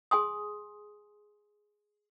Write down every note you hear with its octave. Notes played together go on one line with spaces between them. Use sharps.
G#4 G#5 C6 D#6